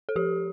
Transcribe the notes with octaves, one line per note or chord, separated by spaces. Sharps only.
A4
F3 G4